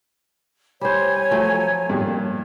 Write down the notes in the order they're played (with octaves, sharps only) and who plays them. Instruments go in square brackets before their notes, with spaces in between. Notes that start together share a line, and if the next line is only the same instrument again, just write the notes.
[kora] G3 C5 [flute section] C#5 G#5
[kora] F3 F#3 A3
[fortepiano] G2 A#2